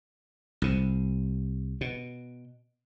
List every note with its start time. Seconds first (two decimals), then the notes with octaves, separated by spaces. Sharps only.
0.62 C2 C3
1.81 B2